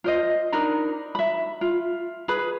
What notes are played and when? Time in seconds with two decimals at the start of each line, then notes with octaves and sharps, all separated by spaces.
0.04 F4 C5 D#5
0.52 D4 D#4 A#4 B5
1.15 E5 B5
1.61 F4
2.28 G#4 B4 B5